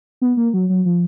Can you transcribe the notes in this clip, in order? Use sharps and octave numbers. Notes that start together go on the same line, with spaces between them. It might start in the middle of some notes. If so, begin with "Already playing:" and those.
B3
A#3
F#3
F#3
F3